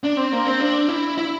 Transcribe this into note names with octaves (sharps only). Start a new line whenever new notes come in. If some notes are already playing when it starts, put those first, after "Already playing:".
D4
C4
A#3
C4
D4
E4
E4